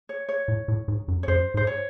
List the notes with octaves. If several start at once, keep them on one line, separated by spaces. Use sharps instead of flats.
C#5
C#5
A2
A2
G#2
F#2
C#5
F#2 C5
G#2 C5
C#5